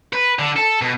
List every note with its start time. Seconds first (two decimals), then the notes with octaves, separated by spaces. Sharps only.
0.13 B4
0.39 D3
0.56 A4
0.81 B2